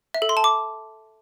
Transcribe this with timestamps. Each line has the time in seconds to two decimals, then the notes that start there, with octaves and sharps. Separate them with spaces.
0.14 E5
0.22 A4
0.29 C6
0.37 A5
0.44 D6